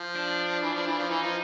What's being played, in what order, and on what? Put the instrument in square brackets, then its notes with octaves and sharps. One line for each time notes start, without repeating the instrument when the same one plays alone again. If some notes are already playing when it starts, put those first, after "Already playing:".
Already playing: [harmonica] F3
[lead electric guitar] D4
[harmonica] E3
F3
E3
F3
[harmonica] E3 [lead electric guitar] D#4
[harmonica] F3